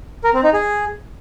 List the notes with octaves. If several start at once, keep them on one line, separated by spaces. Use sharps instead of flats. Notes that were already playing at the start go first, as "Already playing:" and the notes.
A#4
C4
D#4
G#4